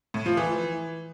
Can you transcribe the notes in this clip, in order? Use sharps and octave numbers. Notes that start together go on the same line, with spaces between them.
A2
F3
E3